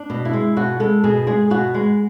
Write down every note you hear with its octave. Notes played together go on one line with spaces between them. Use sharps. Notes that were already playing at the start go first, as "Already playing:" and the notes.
Already playing: D4
B2
E4
G#3
B2 F#4
G#3 A4
B2 G#4
G#3 G#4
B2 F#4
G#3